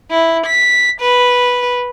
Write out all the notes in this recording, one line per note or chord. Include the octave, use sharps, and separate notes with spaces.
E4
B6
B4